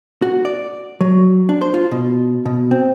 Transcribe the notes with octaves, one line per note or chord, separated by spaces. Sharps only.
F#4
D5
F#3
D4
C5
F4
B2
B2
C4